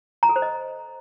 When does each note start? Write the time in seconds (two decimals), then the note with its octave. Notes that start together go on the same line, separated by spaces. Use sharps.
0.23 A#5
0.29 A4
0.36 C5
0.42 D#5